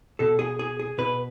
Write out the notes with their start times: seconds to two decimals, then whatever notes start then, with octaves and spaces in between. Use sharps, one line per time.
0.19 B2 A4
0.39 G#4
0.59 G#4
0.79 G#4
0.98 B2 B4